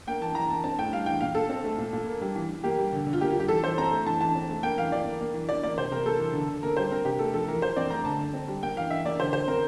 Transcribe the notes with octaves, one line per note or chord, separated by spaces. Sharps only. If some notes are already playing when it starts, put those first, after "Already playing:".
A#3 G5
E3 A5
E3 A#5
A#3 A5
C4 A5
A2 G5
G3 F5
E3 G5
A#2 F5
A#2 A4
C4
A3
A#2
A#2
A#3
G3
E3
E3
A#3 G4
G3
D3
D3
F4
A#3 G4
F4
G3 G4
E3 A4
E3 C5
C4 A#5
A3
E3 A5
E3 A5
C4
A3
A#3 G5
E3 F5
E3 D5
A#3
A#3
E3
E3 D5
A#3 D5
C3 C5
C3 A#4
A#3 A4
E3
D3
D3
A#3 A#4
G3 C5
C4 A#4
C3 G4
A3 A4
F3 A4
E3 A#4
E3 C5
C4 D5
A3 A#5
D3 A5
D3
C4
G3
A#3 G5
E3 F5
E3 E5
A#3 D5
D3 C5
D3 C5
C4 A#4